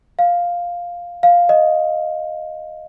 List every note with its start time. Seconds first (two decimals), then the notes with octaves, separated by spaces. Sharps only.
0.19 F5
1.23 F5
1.49 D#5